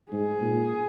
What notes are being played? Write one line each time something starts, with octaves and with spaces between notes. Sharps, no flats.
G#2 G#4
A#2